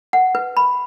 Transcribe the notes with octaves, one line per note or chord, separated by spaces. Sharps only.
F#5
B4
B5